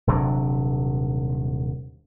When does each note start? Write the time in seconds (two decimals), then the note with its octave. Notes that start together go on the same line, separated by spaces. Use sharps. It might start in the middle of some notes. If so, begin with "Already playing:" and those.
0.07 D#1 C3 F#3 D4